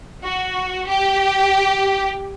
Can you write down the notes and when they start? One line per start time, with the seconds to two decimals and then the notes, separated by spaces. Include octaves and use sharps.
0.23 F#4
0.88 G4